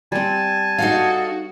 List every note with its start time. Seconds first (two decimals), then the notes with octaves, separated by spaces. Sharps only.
0.12 G3 C4 G#5 A5
0.78 D#4 F#4 A4 F5